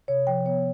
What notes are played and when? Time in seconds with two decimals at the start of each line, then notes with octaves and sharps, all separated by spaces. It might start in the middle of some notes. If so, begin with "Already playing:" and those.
0.08 C3 C#5
0.27 F3 G5
0.45 B3 C#5